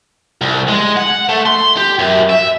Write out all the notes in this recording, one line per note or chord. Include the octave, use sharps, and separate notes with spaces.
C2
G#3
F#5
A3
C6
G4
F#2
E5